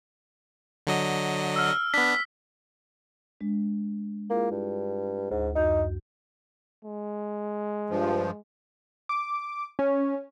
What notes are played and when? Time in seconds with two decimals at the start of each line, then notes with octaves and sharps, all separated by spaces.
0.87 D3 F#3 D#5
1.56 E6 F6
1.94 B3 D4 B6
3.41 G#3 D4
4.30 A#3 E4 F4 G#4
4.51 G2
5.31 D2 G#2
5.55 F#2 D#4 F#4 G6
6.85 G#3
7.90 G2 F3
9.09 D6
9.79 C#4